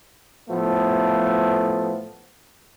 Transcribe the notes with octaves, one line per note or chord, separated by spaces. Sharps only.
A2 F3 A3 B3